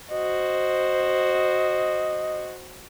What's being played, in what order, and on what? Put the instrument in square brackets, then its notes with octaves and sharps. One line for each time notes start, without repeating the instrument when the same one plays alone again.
[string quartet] F#4 C5 [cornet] D#5